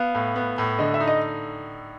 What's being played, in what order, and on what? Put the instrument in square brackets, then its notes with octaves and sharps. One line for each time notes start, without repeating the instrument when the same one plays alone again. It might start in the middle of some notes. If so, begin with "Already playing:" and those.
Already playing: [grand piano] B3 [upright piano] F5
[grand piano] A2
B3
A2
[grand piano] D3 [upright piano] D#5
[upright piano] E5
[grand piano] D#4
[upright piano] D#5